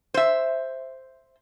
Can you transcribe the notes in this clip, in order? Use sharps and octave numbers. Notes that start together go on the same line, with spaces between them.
C5 E5